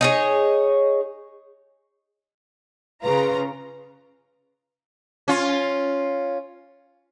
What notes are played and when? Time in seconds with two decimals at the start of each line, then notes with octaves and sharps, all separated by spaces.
0.01 D#4 G#4 C#5
3.03 C#3 F4 B4 A#5
5.28 C#4 F4